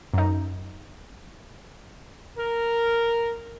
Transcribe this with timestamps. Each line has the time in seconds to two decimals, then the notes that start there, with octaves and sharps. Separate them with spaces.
0.14 F#2 D#4
2.38 A#4